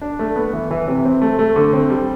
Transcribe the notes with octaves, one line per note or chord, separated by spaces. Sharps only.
D4
A3
B3
E3
E3
C3
C4
A3
A3
D3
C4
G3